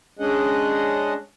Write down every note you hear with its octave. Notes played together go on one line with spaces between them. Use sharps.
G#3 C#4 D4 G#4 D#5 F#5